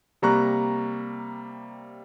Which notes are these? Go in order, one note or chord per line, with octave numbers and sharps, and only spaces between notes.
C3 G3 A#3 A#5 C#6 F#6